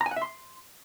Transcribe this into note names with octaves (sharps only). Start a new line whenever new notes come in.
A#5
G#5
F#5
E5
C6